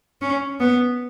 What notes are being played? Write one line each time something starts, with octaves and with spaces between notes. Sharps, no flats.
C#4
B3